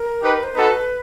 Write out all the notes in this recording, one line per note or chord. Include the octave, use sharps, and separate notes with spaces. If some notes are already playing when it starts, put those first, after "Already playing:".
Already playing: A#4
D#4 G4 B4
C5
B3 D#4 F#4 A4 B4